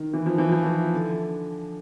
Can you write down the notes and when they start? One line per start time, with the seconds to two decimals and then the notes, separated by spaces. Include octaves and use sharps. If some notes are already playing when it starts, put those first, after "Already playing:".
Already playing: D#3
0.14 E3
0.26 F3
0.38 E3
0.52 F3
0.64 E3
0.93 D3